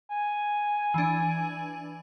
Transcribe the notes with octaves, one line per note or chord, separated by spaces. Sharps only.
G#5
E3 D4